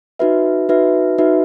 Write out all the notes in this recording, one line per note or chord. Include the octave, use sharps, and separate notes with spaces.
D#4 F#4 B4 E5
D#4 F#4 B4 E5
D#4 F#4 B4 E5